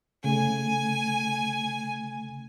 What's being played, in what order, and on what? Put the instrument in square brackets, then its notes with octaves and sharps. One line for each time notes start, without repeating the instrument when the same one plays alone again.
[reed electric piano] C#3 A3 [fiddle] G#5